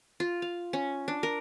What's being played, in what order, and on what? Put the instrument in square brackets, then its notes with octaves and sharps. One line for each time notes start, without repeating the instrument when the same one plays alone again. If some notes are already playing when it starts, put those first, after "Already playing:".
[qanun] F4
F5
C#4
D4
A#4